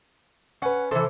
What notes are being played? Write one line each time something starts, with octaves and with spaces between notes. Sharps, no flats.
C#4 B4 F#5
C3 E3 A4 C6